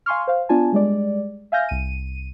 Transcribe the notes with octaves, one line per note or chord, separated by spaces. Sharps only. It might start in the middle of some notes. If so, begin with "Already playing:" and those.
F5 G#5 C6 C#6 F6
C5 F5
B3 D4 F4 G#5 A5
G3 G#3 D5
E5 F5 G#5 F6 G6 A#6
C2 D#7